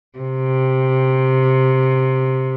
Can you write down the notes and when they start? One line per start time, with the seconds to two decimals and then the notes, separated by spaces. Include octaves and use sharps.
0.19 C3